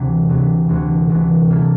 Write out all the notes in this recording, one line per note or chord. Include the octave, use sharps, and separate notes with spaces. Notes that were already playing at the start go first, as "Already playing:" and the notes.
Already playing: D2 C3 E3
D2 C3 E3
D2 C3 E3
D2 C3 E3
E3 A#3 E4 A4